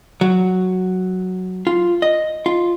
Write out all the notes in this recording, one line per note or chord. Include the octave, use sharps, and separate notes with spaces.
F#3
F4
D#5
F4